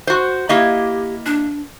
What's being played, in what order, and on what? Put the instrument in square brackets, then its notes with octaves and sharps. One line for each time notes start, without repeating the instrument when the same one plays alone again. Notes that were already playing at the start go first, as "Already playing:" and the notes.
[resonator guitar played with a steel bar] F#4 C5
[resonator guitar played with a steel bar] A#3 E4 D#5 [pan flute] G4
[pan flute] D4